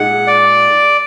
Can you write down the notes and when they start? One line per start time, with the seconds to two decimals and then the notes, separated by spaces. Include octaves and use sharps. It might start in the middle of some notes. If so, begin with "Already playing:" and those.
Already playing: A#2 G#3 D#4 G#4 F#5
0.27 D5